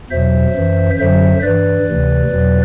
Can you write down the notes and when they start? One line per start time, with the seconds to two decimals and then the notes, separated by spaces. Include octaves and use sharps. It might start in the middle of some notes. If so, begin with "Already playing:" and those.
0.11 E2 B2 F#3 C5 E5
0.55 F#2 E3
0.99 F#2 D3 F#3 C5 E5
1.43 G2 E3 B4 D5
1.87 D2 C3 E3
2.31 E2 B2 F#3